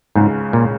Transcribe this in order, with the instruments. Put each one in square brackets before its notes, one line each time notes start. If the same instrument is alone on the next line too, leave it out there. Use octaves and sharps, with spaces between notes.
[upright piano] C#2 C#3 G#3 [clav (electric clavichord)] G#2
[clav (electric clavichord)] A#2